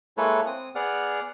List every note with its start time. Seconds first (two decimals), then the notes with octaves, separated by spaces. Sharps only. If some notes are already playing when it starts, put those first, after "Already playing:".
0.17 G#3 A#3 E4 A4 B4 C#5
0.47 C4 D#6
0.75 B3 G#4 D5 F#5 F6